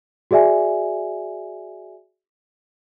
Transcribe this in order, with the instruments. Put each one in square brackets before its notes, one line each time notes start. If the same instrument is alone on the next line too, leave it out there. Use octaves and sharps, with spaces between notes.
[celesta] F#4 G#4 D5 E5 G#5